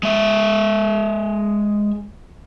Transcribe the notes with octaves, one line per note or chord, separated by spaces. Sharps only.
G#3 E5